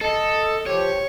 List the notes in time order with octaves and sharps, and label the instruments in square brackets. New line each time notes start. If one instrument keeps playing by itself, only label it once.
[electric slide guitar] A4 [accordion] D#5
[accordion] F3 G4 [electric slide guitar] C#5